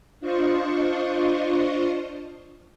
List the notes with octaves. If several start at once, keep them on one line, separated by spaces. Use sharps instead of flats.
D4 F4 C5 D#5 C#6